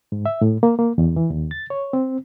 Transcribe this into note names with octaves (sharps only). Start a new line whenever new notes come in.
G#2
E5
A2
A#3
A#3
E2
E3
D#2
A6
C#5
C4